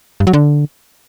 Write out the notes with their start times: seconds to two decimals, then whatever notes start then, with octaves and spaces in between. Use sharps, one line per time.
0.20 G2
0.27 F#3
0.33 D3